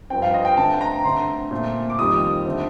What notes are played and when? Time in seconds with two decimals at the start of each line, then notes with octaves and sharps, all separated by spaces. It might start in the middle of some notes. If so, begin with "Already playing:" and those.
0.10 G2 F3 C4 G5
0.22 F5
0.34 D#5
0.45 G5
0.57 D3 A3 C4 A5
0.81 A#5
1.04 D3 A3 C4 C6
1.51 A#2 A3 C4
1.90 D6
1.99 F2 D#3 G3 C4 D#6
2.46 D3 A3 C4